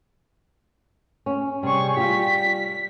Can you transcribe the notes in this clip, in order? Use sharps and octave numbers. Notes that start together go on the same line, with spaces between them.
C#4
C3 G3 G#4 C#6
G3 F4 G4 B6